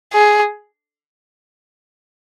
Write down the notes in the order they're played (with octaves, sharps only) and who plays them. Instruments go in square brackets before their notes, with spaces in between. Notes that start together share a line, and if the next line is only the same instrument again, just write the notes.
[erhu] G#4